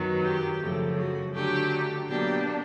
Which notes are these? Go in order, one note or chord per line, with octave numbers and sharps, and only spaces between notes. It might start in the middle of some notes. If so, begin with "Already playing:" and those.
Already playing: F#2 D#3 F#3 B3
G4
F#2 C#3 F3 A3
F#4
D3 F#3 A3 G4
B2 F#3 A#3 D4 G4